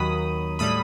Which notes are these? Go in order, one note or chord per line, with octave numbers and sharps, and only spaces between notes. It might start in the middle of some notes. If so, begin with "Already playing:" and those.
Already playing: D#2 D#3 F#3 B5 D#6
A2 G3 B5 D#6